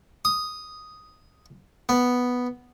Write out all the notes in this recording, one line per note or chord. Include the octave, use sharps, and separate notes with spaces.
D#6
B3